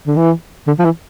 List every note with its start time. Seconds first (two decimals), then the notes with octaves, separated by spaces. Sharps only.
0.07 D3
0.16 E3
0.67 D3
0.79 F3
0.85 E3